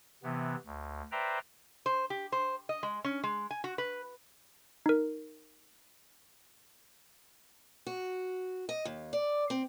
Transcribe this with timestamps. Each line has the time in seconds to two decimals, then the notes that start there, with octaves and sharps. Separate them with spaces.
0.23 C3 E3 B3
0.66 D2
1.12 B4 C5 D5 E5 G5 A#5
1.86 C5
2.10 G4
2.32 C5
2.69 D#5
2.83 G#3
3.04 C#4
3.24 G#3
3.51 G#5
3.64 F#4
3.78 B4
4.86 D#4 A#4
7.87 F#4
8.69 D#5
8.85 D#2
9.13 D5
9.50 C4